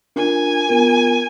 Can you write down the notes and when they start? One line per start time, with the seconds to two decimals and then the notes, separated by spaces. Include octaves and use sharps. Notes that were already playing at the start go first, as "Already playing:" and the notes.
0.16 D4 F4 A#4 G#5
0.69 B3 F4 A#4